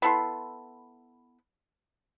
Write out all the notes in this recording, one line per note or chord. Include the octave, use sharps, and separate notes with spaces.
B3 E4 A4 C6